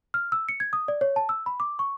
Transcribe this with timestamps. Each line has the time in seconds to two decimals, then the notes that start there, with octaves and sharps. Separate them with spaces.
0.14 F6
0.32 E6
0.49 C#7
0.60 G#6
0.73 D#6
0.88 D5
1.01 C#5
1.16 A5
1.29 E6
1.46 B5
1.60 D6
1.79 C#6